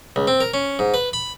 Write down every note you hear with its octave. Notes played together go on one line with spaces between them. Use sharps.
C#2
C4
A#4
C#4
G#2
B4
B5